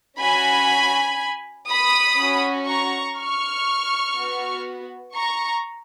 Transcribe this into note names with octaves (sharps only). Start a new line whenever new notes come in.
C#4 F#4 G#5 B5
B5 D#6
C#4 F#4
A#5 C#6
C#6 F6
B3 F#4
A#5 C#6